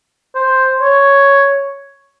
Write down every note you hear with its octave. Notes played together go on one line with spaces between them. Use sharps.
C5
C#5